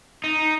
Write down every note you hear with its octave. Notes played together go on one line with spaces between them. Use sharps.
D#4